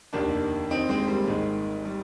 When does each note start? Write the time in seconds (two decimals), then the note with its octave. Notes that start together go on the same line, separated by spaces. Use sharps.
0.13 F1 D#2 D#3 A#3 D4
0.70 C4 D#4
0.89 G#3 C4
1.08 G3 A#3
1.27 G#1 G#2 D#3 G#3
1.85 G3